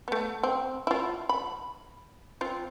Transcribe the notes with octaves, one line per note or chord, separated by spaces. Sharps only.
A3 B3
C4
E4 F4
B5
C4 F4